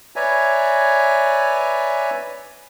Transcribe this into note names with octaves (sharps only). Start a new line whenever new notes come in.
B4 C#5 D5 E5 G#5 A#5